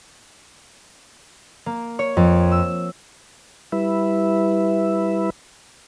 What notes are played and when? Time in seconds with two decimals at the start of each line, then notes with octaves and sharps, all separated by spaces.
1.66 A#3
1.99 C#5
2.17 F2
2.51 E6
3.72 G3 E4 B4 E5